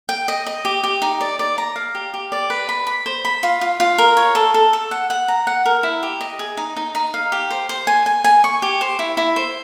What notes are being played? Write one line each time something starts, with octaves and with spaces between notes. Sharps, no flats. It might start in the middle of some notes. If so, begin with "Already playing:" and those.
G5
D#5
D#5
G4
G4
D#4
D5
D5
A#5
F5
G4
G4
D5
B4
B5
B5
C5
B5
F4
F4
F4
A#4
C#5
A4
A4
A4
F#5
F#5
A#5
F#5
A#4
E4
G4
D#5
G#4
D#4
D#4
D#4
F5
G4
C5
C5
G#5
G#5
G#5
C#6
G4
C5
E4
E4
C5